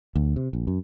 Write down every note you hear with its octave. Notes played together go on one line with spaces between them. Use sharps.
D2
C3
A#1
F#2